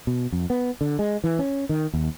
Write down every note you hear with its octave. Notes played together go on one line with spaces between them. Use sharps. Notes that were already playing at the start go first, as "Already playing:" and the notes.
B2
F2
B3
D3
G#3
E3
C#4
D#3
D#2